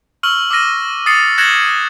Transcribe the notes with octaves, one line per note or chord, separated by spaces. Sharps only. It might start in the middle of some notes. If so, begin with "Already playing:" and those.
C#6 E6 F6 F#7
D6 E6 F6 A#6 D#7
D#6 A6 C7 C#7 D#7
F#6 G#6 A#6 C#7 E7 F#7